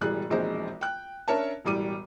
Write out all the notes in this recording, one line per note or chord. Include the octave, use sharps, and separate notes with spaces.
E1 A2 G3 G#4 F#6
E1 A#1 G#3 C4 D#4 C5
G5 F#6
C#4 D4 A#4 C#5 E5 A5
E1 A2 G3 D6 D#7